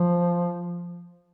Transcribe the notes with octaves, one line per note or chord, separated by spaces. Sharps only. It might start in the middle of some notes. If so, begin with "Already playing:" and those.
Already playing: F3